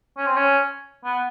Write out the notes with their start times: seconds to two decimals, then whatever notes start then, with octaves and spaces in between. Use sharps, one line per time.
0.17 C#4
0.26 C4
0.36 C#4
1.05 B3